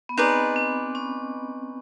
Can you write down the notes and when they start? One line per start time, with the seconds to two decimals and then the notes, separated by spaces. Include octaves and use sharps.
0.09 B3
0.17 C4 D#4 G#4 B4 D5
0.56 C4
0.95 C#4